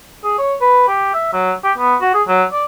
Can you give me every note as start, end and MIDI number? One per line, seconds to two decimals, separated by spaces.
0.24 0.36 68
0.39 0.54 73
0.61 0.87 71
0.88 1.10 67
1.14 1.30 76
1.33 1.53 54
1.64 1.72 67
1.78 1.95 59
2.02 2.10 66
2.14 2.23 68
2.28 2.44 54
2.52 2.65 74